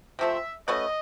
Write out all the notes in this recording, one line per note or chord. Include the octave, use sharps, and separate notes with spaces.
C3 F3 A3 C4 E5
A3 C#4 F#4 B4 D#5